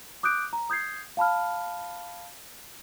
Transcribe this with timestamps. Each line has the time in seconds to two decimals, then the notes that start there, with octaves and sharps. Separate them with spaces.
0.23 D6 D#6 F#6 G6 D7
0.53 A#5
0.70 D#6 G6 G#6 C7
1.17 F5 A5 B5 F6